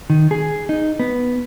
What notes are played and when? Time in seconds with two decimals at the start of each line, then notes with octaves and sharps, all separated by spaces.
0.10 D#3
0.31 G#4
0.69 D#4
0.99 B3